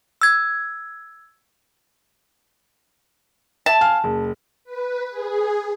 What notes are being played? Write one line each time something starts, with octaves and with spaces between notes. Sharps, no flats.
E6 G#6
E5 A5
F5 G#5 F6
F#1
B4
G#4